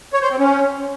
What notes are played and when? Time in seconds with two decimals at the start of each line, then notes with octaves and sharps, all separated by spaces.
0.13 C#5
0.22 C5
0.30 C4
0.39 C#4